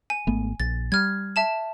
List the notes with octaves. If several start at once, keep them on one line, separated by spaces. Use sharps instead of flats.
G#5
G#1 A3 B3
A#1 A6
G3 F6 G#6
E5 A5 E7